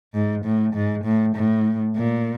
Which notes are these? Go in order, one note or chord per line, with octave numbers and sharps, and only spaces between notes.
G#2
A2
G#2
A2
A2
A#2